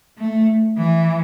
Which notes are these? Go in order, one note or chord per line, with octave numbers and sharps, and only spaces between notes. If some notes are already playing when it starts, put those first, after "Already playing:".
A3
E3